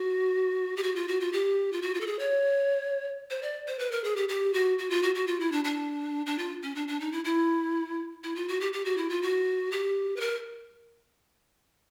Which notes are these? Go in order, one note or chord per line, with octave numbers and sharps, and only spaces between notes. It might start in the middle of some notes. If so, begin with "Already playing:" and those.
Already playing: F#4
G4
F#4
F4
F#4
F4
G4
F4
F#4
F4
A4
G#4
C#5
C5
D5
C5
B4
A#4
G#4
G4
G4
F#4
F#4
F4
F#4
F#4
F4
E4
D4
D4
D4
F4
C#4
D4
D4
D#4
E4
E4
E4
F4
F#4
G4
G4
F#4
E4
F4
F#4
G4
B4
A#4